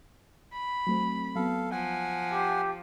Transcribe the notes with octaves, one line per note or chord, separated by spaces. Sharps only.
B5
F#3 A3 C4
F#3 B3 A4 F5
F3 F#5 G#5
G4